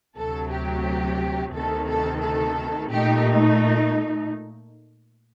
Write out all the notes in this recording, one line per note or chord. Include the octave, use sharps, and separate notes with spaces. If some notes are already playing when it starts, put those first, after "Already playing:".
D2 C3 F#3 A4
G4
D2 C3 D#3 A4
A4
A4
A#2 A3 D#4 G4